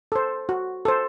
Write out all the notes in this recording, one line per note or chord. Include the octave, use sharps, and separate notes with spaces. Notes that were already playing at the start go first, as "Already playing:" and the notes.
A4 C5
F#4
A4 C5